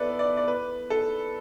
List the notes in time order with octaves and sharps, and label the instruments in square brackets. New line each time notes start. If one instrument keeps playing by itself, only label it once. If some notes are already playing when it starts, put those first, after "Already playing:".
Already playing: [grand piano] B3 E4 A4 B4 D5
D5
D5
B4
A4